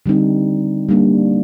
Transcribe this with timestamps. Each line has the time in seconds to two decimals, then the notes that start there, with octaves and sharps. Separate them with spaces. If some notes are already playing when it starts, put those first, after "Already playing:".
0.06 D3 G3 C4 D#4
0.89 G3 A#3 D4